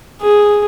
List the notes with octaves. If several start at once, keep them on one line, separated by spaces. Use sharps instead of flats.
G#4